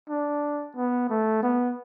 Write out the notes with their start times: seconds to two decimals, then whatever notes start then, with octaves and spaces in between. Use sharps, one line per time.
0.09 D4
0.76 B3
1.10 A3
1.43 B3